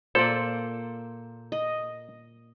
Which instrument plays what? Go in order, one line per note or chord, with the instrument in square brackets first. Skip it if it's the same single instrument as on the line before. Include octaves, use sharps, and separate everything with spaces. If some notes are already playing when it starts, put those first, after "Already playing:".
[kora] A#2 A#3 [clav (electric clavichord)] A4 D5 [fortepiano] C5
[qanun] D#5